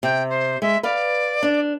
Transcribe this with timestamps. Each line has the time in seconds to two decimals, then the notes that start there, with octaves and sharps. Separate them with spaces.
0.03 C3 G5
0.29 C5
0.62 G#3 E5
0.83 B4 D5 F5
1.43 D4